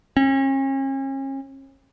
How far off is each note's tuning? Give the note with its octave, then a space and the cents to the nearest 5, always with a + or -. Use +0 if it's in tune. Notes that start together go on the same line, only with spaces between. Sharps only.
C#4 -40